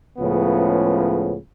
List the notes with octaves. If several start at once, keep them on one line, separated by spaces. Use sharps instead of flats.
C#2 A2 C#3 F3 B3